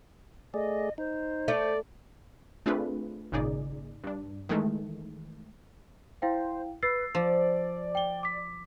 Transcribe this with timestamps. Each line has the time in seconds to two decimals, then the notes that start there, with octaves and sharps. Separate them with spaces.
0.54 A3 G#4 D5 D#5
0.98 D#4 C5
1.48 A3 D5
2.66 A3 C4 D4 F4 G#4 B4
3.32 G#1 A#2 C#3 D#4 G#4 D5
4.04 G2 D4
4.49 D#3 E3 G#3 A3
6.22 E4 C5 F5 G5
6.83 B4 E6 A6 C7
7.15 F3 D5
7.95 G5 G7
8.23 D6 B6